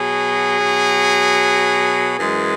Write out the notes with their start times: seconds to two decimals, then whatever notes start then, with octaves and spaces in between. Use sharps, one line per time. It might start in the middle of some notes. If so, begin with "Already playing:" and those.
Already playing: B2 F#3 G#4
0.60 B2 F#3
2.16 F#2 E3 G#3